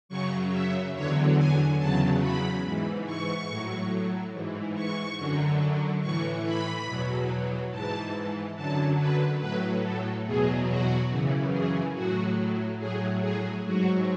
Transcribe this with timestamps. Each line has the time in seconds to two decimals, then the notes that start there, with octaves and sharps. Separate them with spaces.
0.09 F#2 C#3 F#3 C#6
0.52 E5
0.94 E2 D3 F#3 C#5
1.36 G#5
1.79 E2 C#3 F#3 A5
2.20 B5
2.63 G#2 E3
3.06 C#6
3.48 A2 F#3
4.33 G#2 E3
4.75 C#6
5.17 F#2 D3 F#3
6.01 A2 E3 C#6
6.45 B5
6.86 E2 B2 F#3
7.71 G#2 E3 A5
8.55 F#2 D3 F#3 A5
8.99 B4
9.40 A2 F#3 B4
9.83 A4
10.26 E2 B2 F#3 G#4
10.68 F#4
11.10 F#2 C#3 E3
11.52 G#4
11.94 A2 F#3 F#4
12.79 A2 F#3 G#4
13.22 G#4
13.64 G#2 F#3 F#4